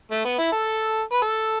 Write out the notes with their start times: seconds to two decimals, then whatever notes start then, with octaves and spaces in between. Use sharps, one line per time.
0.11 A3
0.25 B3
0.38 E4
0.52 A4
1.12 B4
1.22 A4